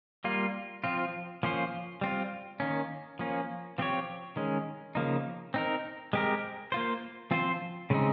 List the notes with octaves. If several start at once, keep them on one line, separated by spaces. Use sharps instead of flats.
G3 A#3 F4
F3 C4 F4
F3 A#3 C#4 F4 C5
G3 C4 F4
D#3 A#3 C#4
F3 A#3 C#4
F3 C4 G4 C#5
D#3 G#3 C#4
C#3 F3 A#3 D#4
C4 D#4 A#4
G#3 C4 G4 A#4
A#3 F4 C5
F3 C4 F4 C5
C#3 G#3 C4 D#4